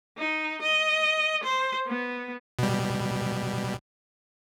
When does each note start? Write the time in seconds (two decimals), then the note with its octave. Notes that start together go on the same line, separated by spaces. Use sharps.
0.18 D#4
0.62 D#5
1.44 C5
1.87 B3
2.59 B2 G3